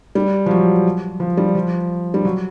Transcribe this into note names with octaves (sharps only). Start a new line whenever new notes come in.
G3
F3
F#3
F3
G3
F3
G3
F#3